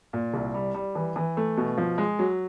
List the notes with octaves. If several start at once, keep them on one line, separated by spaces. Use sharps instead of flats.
A#2
C2
G3
G3
E3
E3
A3
B2
F3
G#3
F#3